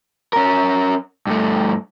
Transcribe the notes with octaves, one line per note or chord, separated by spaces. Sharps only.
C#4 A#4
G2 A3